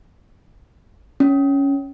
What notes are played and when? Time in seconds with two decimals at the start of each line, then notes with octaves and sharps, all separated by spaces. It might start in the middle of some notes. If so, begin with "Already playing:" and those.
1.20 C#4